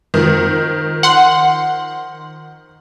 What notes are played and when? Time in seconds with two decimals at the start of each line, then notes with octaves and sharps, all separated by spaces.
0.14 D#3 F3
1.03 F#5 C6